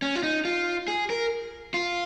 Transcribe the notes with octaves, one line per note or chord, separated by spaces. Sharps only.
C#4
F4
D#4
F4
G#4
A#4
F4